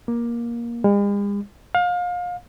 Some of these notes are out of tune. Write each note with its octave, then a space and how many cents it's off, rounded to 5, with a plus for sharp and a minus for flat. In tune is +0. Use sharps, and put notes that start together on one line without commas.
A#3 +15
G#3 -45
F5 +30